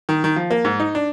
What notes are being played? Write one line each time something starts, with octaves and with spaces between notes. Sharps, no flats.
D#3
D#3
F3
A#3
G#2
D#4
D4